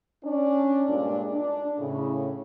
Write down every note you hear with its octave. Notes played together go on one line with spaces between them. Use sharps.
C#4 D4
G2 A#2 G#3 D4
D4
A2 C#3